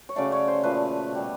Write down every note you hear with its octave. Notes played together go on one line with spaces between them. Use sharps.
C#5
C#3 F#3 A3 D5
C#5
C5
A#2 F3 A3 B4
B2 G3